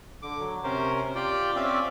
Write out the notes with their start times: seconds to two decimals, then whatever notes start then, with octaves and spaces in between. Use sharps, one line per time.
0.23 D3 D6
0.40 F#3
0.64 C3 C#4 A#4 C5
1.15 F4 G4 D5 G5
1.56 C4 C#4 D5 E5 F5